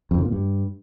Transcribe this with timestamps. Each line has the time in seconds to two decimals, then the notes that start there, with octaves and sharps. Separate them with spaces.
0.11 F2
0.18 D3
0.25 A#2
0.32 G2